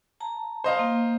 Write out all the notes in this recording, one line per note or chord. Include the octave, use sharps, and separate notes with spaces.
A5 A#5
C5 D#5 F5
A#3